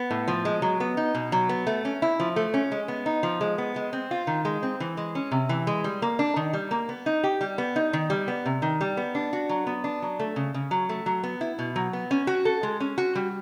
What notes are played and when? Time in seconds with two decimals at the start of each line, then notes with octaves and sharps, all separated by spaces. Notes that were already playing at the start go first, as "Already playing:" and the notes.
Already playing: B3
0.11 A2
0.28 F3
0.45 G#3
0.62 F#3
0.80 B3
0.97 D#4
1.15 B2
1.32 F#3
1.49 B3
1.67 A3
1.85 C#4
2.02 E4
2.20 F3
2.36 A3
2.54 C#4
2.72 G#3
2.88 B3
3.06 D#4
3.23 F3
3.41 G#3
3.58 B3
3.76 G#3
3.93 C4
4.11 F4
4.27 D#3
4.45 G#3
4.63 C4
4.80 E3
4.97 G#3
5.15 C#4
5.32 C3
5.49 E3
5.67 G#3
5.84 G3
6.02 A#3
6.19 D4
6.36 D#3
6.53 G3
6.71 A#3
6.89 B3
7.06 D#4
7.23 G4
7.41 G3
7.58 B3
7.76 D#4
7.93 D#3
8.10 G3
8.28 B3
8.46 C3
8.62 D#3
8.81 G3
8.97 B3
9.15 D4
9.33 F#4
9.49 F#3
9.67 B3
9.84 D4
10.02 F#3
10.20 A3
10.36 C#3
10.54 C#3
10.71 F#3
10.89 A3
11.06 F#3
11.23 B3
11.41 E4
11.59 B2
11.76 F#3
11.93 B3
12.11 C#4
12.27 F#4
12.45 A4
12.63 G#3
12.80 C#4
12.98 F#4
13.15 G3